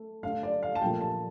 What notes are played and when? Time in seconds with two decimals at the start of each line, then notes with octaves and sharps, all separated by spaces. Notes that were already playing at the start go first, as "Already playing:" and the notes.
Already playing: A3
0.23 D3 A3 F5
0.43 D5
0.63 F5
0.75 A5
0.81 A#2 F3 A3 G5
1.01 A5